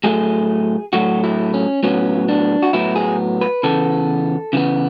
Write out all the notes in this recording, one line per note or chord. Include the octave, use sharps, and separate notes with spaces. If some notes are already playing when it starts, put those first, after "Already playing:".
A2 F#3 A3 G#4
A2 F#3 A3 F#4
E4
C#4
A2 F#3 B3 C#4
D4
F#4
A2 F#3 B3 E4
G#4
B4
C#3 E3 B3 A4
C#3 E3 B3